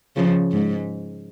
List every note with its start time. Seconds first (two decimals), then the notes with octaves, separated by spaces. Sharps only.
0.16 C#3 F3
0.52 G#2